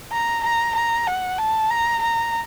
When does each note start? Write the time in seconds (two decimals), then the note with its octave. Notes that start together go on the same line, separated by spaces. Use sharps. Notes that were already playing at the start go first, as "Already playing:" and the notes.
0.13 A#5
0.44 A#5
0.75 A#5
1.07 F#5
1.38 A5
1.70 A#5
2.02 A#5